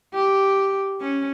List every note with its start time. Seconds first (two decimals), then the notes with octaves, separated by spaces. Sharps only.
0.14 G4
1.01 C#4